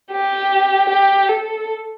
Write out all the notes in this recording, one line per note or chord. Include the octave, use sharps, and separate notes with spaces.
G4
G4
A4